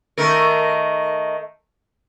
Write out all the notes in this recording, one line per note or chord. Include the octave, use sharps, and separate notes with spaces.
D#3 A3 A#4